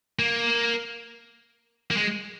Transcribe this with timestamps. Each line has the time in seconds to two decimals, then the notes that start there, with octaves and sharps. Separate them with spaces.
0.19 A#3
1.91 A#3
1.97 G#3